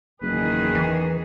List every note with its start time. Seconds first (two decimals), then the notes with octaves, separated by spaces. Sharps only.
0.22 F#1 E2 D#3 G#4 B4
0.75 E3